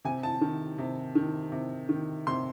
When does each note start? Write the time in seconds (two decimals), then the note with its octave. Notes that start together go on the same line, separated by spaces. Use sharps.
0.05 C3 G#5
0.23 A5
0.41 D#3
0.78 C3
1.15 D#3
1.52 C3
1.89 D#3
2.27 C3 C6